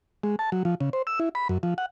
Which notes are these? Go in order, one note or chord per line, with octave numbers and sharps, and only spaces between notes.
G#3
A5
F#3
F3
C#3
C5
E6
E4
B5
F#2
F3
F#5